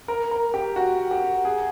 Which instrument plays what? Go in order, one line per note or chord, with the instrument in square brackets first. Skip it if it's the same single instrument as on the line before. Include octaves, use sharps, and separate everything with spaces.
[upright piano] A#4
A#4
G4
F#4
G4
G#4